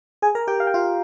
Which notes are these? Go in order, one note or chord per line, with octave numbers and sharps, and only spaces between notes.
G#4 G#5
A#4 A#5
G4 G5
F5
G5
F4 F5